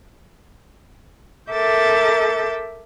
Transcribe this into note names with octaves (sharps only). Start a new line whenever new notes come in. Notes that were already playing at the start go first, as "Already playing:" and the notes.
A4 A#4 E5 D6 G6 A6